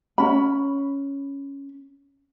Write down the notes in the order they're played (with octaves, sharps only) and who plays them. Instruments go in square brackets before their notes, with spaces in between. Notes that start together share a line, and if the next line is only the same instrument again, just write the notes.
[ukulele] C#4 B5